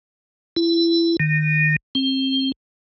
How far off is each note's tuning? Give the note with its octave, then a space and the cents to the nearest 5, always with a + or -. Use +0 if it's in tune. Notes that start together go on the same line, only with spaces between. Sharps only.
E4 +25
D#3 -25
C4 +30